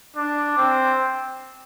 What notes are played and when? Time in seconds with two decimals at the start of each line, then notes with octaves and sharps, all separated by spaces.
0.17 D4
0.58 C4